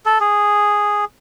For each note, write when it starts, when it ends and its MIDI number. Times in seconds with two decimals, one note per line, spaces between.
0.06 0.19 69
0.20 1.05 68